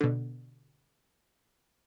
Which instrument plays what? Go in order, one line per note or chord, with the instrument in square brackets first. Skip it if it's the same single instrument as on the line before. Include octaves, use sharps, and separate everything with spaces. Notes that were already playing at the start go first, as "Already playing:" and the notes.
[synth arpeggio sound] B2 D3